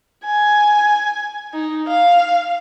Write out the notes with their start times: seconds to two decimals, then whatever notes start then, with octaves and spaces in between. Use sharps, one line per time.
0.24 G#5
1.54 D#4
1.87 F5